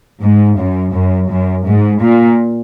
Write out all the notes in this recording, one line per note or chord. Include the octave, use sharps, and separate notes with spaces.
G#2
F#2
F#2
F#2
G#2
A#2